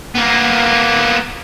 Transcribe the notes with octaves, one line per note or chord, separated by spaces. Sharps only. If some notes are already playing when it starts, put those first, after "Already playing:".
A#3 B3